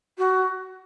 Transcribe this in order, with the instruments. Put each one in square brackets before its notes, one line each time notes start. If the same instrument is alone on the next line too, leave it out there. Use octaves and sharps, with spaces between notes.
[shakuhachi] F#4